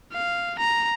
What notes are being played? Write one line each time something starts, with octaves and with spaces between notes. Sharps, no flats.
F5
A#5